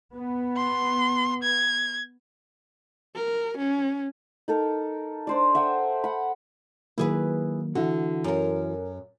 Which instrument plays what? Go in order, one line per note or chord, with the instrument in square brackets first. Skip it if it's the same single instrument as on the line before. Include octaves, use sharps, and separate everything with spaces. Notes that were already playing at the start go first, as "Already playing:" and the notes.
[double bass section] B3
[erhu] C6
G#6
[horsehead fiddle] A#4
C#4
[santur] D#4 A4 A#4
D4 C5 D5
E5 F#5 G5 D#6
F#5 B5
[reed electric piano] D#3 F#3 A#3 [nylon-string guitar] E4 G#4 B4
[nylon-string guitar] D3 [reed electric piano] E3 E4 F#4
[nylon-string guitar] F#2 A#4